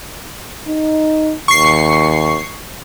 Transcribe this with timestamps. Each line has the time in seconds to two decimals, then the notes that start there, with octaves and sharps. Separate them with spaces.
0.68 D#4
1.48 D#2 C#6 C7